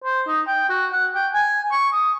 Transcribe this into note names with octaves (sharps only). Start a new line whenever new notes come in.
C5
D#4
G5
F#4
F#5
G5
G#5
C#6
D#6